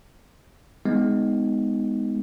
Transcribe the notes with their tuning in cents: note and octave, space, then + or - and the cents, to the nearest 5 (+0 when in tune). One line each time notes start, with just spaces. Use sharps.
G#3 +0 B3 +25 D#4 +10